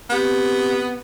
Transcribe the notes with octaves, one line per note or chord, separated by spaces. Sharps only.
B3 C4 G4